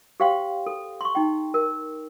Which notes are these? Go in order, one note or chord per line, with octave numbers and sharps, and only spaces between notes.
G4 C5 F5 G5 C6
A4
C6 C#6
D#4 G5
A#4